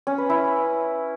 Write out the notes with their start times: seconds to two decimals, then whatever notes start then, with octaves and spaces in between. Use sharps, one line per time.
0.07 C#4
0.18 B4
0.30 E4